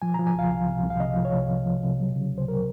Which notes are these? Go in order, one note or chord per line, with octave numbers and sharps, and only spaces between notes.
F3 G#5
F3 A#5
G#5
C2 F5
C2
C3
C2
F5
C3 D#5
F3
C#5
C2
C2
F3
C3
F#3
C#3
C#2
C5
F#3 A#4